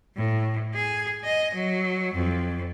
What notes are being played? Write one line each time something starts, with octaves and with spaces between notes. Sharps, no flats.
A2
G#4
D#5
F#3
F2